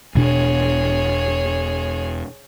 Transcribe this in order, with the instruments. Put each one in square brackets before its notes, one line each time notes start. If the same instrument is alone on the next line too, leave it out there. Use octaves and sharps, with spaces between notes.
[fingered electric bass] E1 B2 D4 [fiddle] G#4 C#5